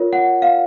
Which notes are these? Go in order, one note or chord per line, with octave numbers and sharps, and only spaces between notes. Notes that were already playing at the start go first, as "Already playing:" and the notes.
Already playing: F4 A#4 C#5
F#5
F5